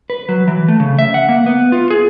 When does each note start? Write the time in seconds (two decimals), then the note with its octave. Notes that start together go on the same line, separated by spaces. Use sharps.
0.10 B4
0.29 F#3
0.48 E3
0.68 A3
0.80 C#3
0.99 E5
1.14 F#5
1.29 A#3
1.46 B3
1.72 F4
1.90 G#4